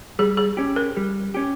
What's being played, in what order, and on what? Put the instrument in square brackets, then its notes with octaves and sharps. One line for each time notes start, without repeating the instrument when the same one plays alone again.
[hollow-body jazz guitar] G3 [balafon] G#4
[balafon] G#4
[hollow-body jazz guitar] C#4 G4
[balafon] A#4
[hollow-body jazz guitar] G3
C#4 G4